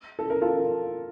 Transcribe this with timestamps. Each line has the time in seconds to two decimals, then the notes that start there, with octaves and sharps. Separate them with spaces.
0.19 A4
0.30 A#4
0.42 F4 A4